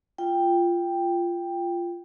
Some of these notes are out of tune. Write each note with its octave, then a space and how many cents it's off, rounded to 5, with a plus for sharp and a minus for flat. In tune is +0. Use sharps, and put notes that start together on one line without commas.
F4 -10 G5 +10